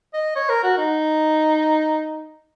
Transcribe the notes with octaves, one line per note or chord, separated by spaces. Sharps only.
D#5
C#5
A#4
F#4
D#4